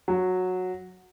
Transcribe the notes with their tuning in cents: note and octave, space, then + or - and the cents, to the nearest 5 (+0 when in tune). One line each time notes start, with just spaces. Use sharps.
F#3 -10